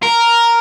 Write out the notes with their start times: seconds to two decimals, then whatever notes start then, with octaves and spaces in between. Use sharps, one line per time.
0.03 A#4